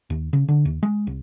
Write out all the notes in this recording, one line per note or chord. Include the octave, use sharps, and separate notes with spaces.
D#2
C#3
D3
D#2
G#3
C2